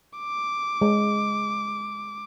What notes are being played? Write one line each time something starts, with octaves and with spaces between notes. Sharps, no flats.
D6
G#3